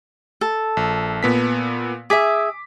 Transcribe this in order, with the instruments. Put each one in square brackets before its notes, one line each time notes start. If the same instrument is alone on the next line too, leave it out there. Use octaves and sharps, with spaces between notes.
[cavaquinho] A4
[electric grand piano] A#1
A#2 B3 B6
[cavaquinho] G#4 E5 [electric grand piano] D6 B6